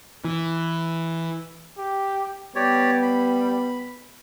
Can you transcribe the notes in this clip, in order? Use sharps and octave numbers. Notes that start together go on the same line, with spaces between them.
E3
G4
G3 B3 G4 C#5 D5
B5